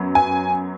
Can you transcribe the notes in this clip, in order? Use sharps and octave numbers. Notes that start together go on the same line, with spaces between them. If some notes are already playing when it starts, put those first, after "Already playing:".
Already playing: F#2 F#3 B3
G#5